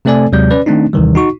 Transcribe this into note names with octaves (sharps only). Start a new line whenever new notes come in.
C3 A3 C4 A4 D5 G#5
D#2 C3 F#3 G#3 D5 G6
C#4 B4 D5
D#3 A3 C4 D4 D#4
D#2 C3 D#3 E3 G3
D#4 F#4 C#6